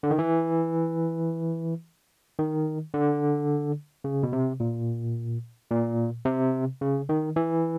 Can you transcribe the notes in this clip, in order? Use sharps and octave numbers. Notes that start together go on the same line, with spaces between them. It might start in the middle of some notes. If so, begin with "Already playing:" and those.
D3
D#3
E3
D#3
D3
C#3
B2
C3
A#2
A#2
C3
C#3
D#3
E3